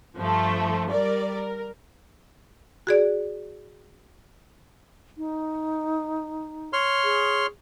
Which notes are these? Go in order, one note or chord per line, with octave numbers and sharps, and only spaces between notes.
G2 F3 A3
G3 A#4 D5
A#4
F#4 G#4 D5
D#4
C#5 C6 F6
G#4